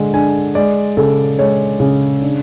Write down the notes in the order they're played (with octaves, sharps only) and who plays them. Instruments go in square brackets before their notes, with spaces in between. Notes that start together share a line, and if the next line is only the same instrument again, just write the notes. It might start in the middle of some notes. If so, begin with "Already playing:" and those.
Already playing: [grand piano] D3 G#3
D4 G#5
G#3 D5
C#3 A4
G#3 C#5
C#3
D4